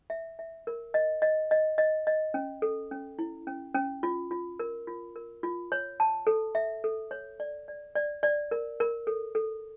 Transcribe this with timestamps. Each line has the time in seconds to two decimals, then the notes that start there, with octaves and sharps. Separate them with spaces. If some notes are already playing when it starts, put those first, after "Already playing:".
0.10 E5
0.39 E5
0.67 A#4
0.94 D#5
1.22 D#5
1.51 D#5
1.78 D#5
2.07 D#5
2.34 C#4
2.62 A4
2.91 C#4
3.19 E4
3.47 C#4
3.74 C#4
4.03 F4
4.31 F4
4.60 A#4
4.87 F4
5.16 A#4
5.43 F4
5.72 C#5
6.00 A5
6.27 A4
6.55 E5
6.84 A4
7.11 C#5
7.40 D5
7.68 D5
7.95 D5
8.23 D5
8.51 A#4
8.80 A#4
9.07 A4
9.35 A4